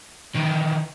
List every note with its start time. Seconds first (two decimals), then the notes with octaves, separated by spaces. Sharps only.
0.35 D#3 E3